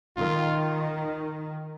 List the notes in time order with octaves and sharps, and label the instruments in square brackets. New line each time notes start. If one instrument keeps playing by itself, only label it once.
[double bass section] D#3 [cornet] F4